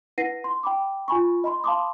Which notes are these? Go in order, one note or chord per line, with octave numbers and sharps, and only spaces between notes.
E4 B4 F#5 A#6 C7 D#7
C6
G5 B5 D6
F4 G#5 B5 C#6
D#5 B5 C6
F5 A5 B5 C6 D6 D#6